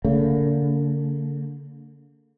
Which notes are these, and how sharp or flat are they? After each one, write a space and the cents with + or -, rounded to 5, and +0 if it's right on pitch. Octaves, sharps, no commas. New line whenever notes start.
D3 -40 A#3 -45